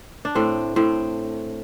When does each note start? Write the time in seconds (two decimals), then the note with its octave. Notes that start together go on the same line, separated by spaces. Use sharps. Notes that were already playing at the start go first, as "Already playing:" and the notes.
0.25 D4
0.35 A2 C4
0.76 A2 C4